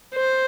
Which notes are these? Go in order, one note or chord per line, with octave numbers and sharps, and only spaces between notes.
C5